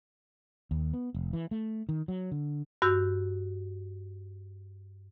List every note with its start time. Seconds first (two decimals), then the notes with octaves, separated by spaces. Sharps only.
0.71 D#2
0.93 B3
1.15 F1
1.33 E3
1.51 A3
1.89 D#3
2.08 F#3
2.32 D3
2.82 G2 F#4 E6 G6